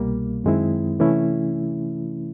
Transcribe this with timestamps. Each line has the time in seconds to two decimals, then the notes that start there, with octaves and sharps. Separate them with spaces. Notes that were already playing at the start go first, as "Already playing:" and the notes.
Already playing: C2 B2 G3 A#3
0.44 F#2 D#3 G#3 C4 E4
0.99 C3 E3 A3 C#4 E4